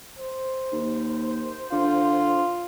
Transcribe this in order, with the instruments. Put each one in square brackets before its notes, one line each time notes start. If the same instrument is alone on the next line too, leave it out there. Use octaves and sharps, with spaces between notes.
[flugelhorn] C5
[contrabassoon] D#2
[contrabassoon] D3 [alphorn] F4